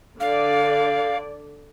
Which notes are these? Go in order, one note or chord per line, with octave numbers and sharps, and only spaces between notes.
D3 D5 F5